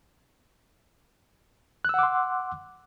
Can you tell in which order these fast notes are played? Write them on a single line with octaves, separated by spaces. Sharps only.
F#6 E6 F#5 D6 C6